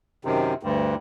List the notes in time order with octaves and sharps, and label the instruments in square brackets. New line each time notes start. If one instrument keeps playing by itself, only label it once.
[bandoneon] F#2 C3 D#3
D2 G2